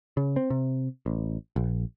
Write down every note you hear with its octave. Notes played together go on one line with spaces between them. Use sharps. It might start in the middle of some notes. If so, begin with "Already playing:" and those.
C#3
C4
C3
A1
A#1